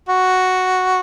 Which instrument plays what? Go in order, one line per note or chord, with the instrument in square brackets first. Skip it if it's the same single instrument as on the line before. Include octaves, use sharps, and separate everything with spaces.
[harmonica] F#4